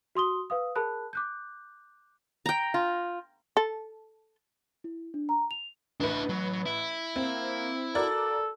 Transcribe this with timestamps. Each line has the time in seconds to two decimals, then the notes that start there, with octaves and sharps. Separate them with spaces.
0.15 F#4 C6 D#6 G7
0.50 B4 F5 D#6
0.76 G#4 A#4 A5 B5 F#6
1.13 D6 F#6 G6
2.46 G5 A#5
2.74 F4
3.57 A4
4.84 E4
5.14 D4
5.29 A#5
5.51 F7
6.00 A1 D4 B4 E5
6.29 F#3
6.66 E4
7.16 A#3 C4
7.95 F#4 A4 A#4 D5